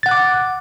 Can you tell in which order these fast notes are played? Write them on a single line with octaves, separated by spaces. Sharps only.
A6 F#5 F#6 D6